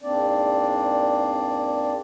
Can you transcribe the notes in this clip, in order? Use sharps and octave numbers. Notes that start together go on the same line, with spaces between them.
E2 G#2 A#3 C4 D4 D5